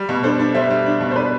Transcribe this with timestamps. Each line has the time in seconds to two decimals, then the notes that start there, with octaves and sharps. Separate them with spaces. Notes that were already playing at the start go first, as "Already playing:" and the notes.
Already playing: G3
0.09 B2
0.23 D4 A4 C5
0.39 D4
0.54 G3 C5 E5
0.70 G3
0.86 D4
1.01 B2
1.11 C5
1.16 B4 D5